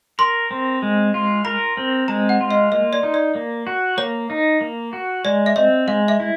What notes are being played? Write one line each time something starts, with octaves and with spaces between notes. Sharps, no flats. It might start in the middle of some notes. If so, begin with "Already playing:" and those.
A#4 C6
C4
G#3
F4
A#4 B5
C4
G#3 A#5
F#5
F4
D#5
A#3 D#5
D5
D#4
D5
A#3
F#4
A#3 C#5
D#4
A#3
F#4
G#3 D5
E5
C4 D#5
G#3 F5
E5
E4